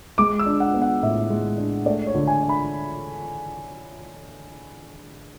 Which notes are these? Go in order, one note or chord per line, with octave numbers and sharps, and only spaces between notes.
G#3 D6
E6
D4
F#5
B3
F#5
A2 E5
G#3
D4
A3 D5
C#5
D3
G#5
D4
B5